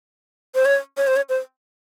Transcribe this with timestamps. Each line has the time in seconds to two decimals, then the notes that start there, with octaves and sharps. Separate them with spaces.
0.55 C5
0.65 C#5
0.97 C#5
1.07 C5
1.16 C#5
1.29 C5